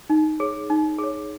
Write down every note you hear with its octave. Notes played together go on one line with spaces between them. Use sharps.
D#4
G#4 C#5
D#4
G#4
C#5